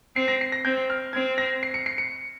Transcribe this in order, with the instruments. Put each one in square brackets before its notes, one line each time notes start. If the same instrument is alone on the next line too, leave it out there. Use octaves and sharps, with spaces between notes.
[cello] C4 [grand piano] C7
[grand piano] A#6
C7
A#6
[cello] C4 [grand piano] G6
[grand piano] F6
[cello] C4 [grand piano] G#6
[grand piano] A#6
C7
C#7
C7
C#7